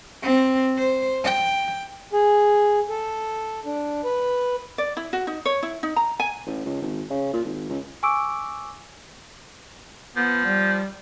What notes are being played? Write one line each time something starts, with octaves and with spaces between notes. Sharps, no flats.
C4
C5
G5
G#4
A4
D4
B4
D5
E4
F#4
D#4
C#5
E4
D#4
A#5
G#5
A1
C#2
G#1
C#3
A#2
G#1
C#2
G#5 C#6 D6 E6 D7
F3 B3
G3